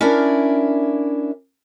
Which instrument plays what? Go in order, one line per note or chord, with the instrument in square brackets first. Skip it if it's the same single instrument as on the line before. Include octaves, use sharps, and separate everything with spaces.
[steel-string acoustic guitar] C#4 D4 E4 A#4 D5